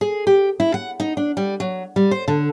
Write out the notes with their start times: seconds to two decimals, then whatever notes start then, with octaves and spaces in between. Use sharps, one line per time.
0.01 G#4
0.27 G4
0.60 E4
0.74 F#5
1.00 D#4
1.17 D4
1.37 G3
1.60 F#3
1.96 G3
2.11 C5
2.28 D3